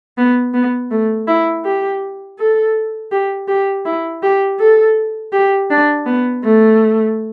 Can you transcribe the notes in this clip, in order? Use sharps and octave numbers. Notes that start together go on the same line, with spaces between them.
B3
B3
A3
E4
G4
A4
G4
G4
E4
G4
A4
G4
D4
B3
A3